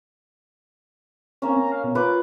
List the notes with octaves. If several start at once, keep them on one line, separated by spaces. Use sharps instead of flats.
A#3 C4 C#4
A#5
F5
B2
F4 B4 D6